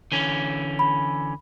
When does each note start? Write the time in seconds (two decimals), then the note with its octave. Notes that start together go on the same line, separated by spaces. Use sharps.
0.12 D3 E3 C#4
0.79 B5